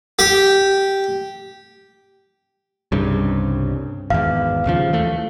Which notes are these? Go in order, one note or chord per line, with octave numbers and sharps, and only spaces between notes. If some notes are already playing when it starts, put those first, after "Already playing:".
G4
C2 G2 C#3
G#1 E2 F5
D#2 C#3 F3
E3 A3